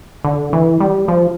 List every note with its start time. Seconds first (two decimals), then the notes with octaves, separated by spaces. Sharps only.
0.25 D3
0.53 E3
0.80 G3
1.08 F3